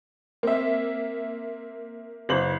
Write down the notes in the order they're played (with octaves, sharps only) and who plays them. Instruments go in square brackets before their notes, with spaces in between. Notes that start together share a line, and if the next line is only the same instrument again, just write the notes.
[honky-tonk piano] A#3 E5 [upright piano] C4
[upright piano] F#1 C5 F#7